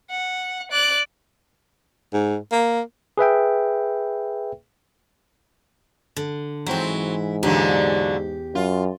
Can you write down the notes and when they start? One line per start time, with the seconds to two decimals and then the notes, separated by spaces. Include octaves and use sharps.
0.10 F#5
0.71 D5 F#6
2.13 G#2
2.52 A#3
3.18 G#4 B4 E5 G5
6.17 D3
6.66 G#2 E3 F#3 C4 E4
7.43 E2 A#2 D3 F#3 G4
8.55 F#2 F4